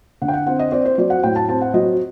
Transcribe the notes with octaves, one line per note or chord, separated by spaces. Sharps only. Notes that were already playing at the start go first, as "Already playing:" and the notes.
D3 F#5
G5
F#5
C4 F#5
D#5
C4 D5
C5
F#3 D5
F#5
A2 G5
A5
C4 A5
F#5
F#3 D#5